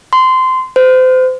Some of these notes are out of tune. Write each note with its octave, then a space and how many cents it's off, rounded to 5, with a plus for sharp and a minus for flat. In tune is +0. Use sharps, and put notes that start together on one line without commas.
C6 -20
C5 -30